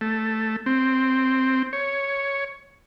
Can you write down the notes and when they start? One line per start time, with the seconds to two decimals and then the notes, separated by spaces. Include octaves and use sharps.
0.01 A3
0.66 C4
1.73 C#5